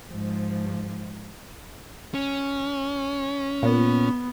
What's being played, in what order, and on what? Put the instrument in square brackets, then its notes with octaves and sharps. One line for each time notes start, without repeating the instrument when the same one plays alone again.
[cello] G#2 F3
[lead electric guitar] C#4
[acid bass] A#2 [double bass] B3